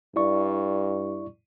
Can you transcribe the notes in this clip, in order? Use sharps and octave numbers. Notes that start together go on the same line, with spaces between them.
G2 E4 D5 C#6